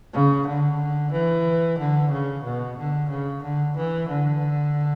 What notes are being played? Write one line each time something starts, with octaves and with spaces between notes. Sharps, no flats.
C#3
D3
E3
D3
C#3
B2
D3
C#3
D3
E3
D3